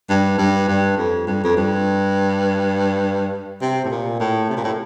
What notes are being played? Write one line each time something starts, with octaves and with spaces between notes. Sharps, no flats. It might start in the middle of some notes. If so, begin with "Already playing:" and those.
G2
G2
G2
F2
G2
F2
G2
C3
A2
A#2
A2
C3
A#2
A2